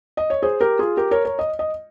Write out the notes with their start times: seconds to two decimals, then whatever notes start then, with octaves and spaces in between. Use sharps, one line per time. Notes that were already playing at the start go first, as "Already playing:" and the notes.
0.17 D#5
0.30 C#5
0.42 G#4 C5
0.61 G4 A#4
0.79 F4 G#4
0.97 G4 A#4
1.11 A#4 C#5
1.25 A#4 C#5
1.39 D#5
1.59 D#5